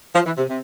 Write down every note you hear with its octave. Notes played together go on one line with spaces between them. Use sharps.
F3
E3
C3
C3